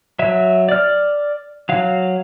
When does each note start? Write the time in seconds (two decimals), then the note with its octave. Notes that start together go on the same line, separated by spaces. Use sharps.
0.19 F#3 E5
0.69 D5 F6
1.69 F#3 F5